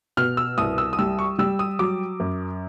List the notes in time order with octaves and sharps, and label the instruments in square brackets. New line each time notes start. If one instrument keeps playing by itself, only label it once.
[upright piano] B2 F6
E6
C2 D#6
E6
D#6
G3 E6
C#6
G3 E6
D#6
F#3 D6
F#2